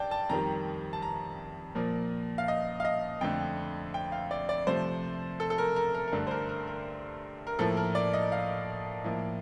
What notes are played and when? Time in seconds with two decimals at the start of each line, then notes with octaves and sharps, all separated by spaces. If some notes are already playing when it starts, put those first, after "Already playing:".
Already playing: G2 D5 G5 A5
0.11 A5
0.29 F2 D#3 G3 A#5
0.93 A5
1.02 A#5
1.75 A#2 F3 A#3
2.38 F5
2.48 D#5
2.80 F5
2.85 D#5
3.21 F2 D3 A3 G5
3.94 G5
4.12 F5
4.31 D5
4.49 D5
4.67 C3 F3 A3 C5
5.40 A4
5.50 A4
5.58 A#4
5.76 A#4
5.95 A#4
6.07 A#4
6.13 G2 D3 A3 A4
6.27 C5
6.31 A#4
6.49 A#4
6.67 A#4
7.47 A#4
7.59 A2 F3 A#3 A4
7.77 A#4
7.95 D5
8.13 D#5
8.32 F5
9.04 A2 F3 A#3